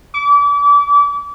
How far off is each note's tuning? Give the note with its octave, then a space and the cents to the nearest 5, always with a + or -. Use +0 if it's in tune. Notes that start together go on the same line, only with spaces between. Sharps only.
D6 -35